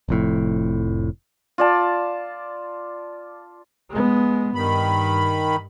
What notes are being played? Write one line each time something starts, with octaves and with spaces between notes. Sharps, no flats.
F1 F2 A2
F4 D5 A5
G#3 B3
G2 D#3 B5